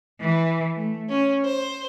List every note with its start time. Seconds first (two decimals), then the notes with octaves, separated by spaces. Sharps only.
0.20 E3
0.76 A3
1.09 C#4
1.44 C5